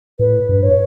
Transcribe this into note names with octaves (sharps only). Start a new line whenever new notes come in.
A2 B4
G2
C#5